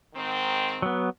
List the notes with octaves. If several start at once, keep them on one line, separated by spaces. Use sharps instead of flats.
G#2 D#3 C4
F#3 B3